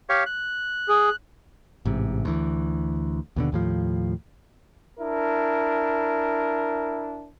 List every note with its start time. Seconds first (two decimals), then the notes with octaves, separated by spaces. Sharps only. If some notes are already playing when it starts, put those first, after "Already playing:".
0.09 G4 C#5 F5
0.26 F#6
0.89 G#4
1.85 A1 G#2 C3
2.25 D2 E3
3.36 D#2 B2 D3
3.52 D#2 A2 F3
5.00 D4 E4 A#4